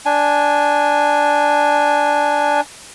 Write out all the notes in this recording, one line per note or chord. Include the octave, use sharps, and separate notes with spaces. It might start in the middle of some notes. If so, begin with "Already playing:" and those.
D4 G#5